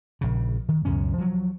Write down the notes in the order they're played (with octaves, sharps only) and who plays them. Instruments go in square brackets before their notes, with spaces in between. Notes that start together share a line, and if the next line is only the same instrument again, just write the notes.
[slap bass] A#1 C#3
D#3
C#2 F#2 B2 C#4
F3 F#3